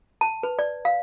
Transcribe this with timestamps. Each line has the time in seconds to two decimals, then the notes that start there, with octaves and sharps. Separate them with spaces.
0.21 A5
0.43 B4
0.59 D5
0.85 F5